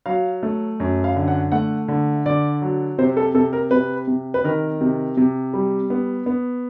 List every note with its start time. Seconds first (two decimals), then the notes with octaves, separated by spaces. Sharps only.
0.06 F#3 F5
0.43 A3
0.80 F#2
1.04 F5
1.16 D3
1.28 F#5
1.52 A3 F#5
1.88 D3
2.26 D3 D5
2.62 F#3
2.98 C3 C5
3.17 A4
3.35 C3 A4
3.53 A#4
3.71 C3 B4
4.08 C3
4.34 B4
4.44 D#3 A#4
4.81 C3
5.17 C3
5.54 G3
5.90 B3
6.26 B3